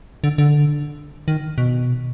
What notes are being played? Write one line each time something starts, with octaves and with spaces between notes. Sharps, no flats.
D3
D3
D#3
B2